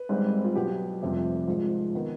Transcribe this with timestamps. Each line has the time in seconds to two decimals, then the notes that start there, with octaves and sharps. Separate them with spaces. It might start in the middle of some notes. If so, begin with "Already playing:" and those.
Already playing: B4
0.09 G#1 G#2 G3 C4
0.44 F4
0.55 B1 B2 B3 G4
1.02 F1 F2 C3 G3
1.47 G#1 G#2 F3 F4
1.95 D#3 B3